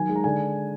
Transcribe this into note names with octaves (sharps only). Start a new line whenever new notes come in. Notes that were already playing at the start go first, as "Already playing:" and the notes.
Already playing: D#3 F#3 G#5
G#3
A#5
D3 G#5